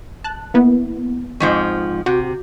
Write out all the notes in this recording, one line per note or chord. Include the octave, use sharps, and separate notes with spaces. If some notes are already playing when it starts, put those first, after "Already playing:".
A5 F#6
A#3 B3 E4
F2 G#2 F3 C#6
C3 F#4